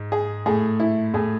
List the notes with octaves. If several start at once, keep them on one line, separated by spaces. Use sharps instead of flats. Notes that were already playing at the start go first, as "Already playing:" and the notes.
Already playing: G#2
G#4
A2 A3 G#4
E4
A2 A3 G#4